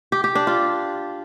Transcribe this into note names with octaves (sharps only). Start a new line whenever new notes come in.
G4
G4
D4
F4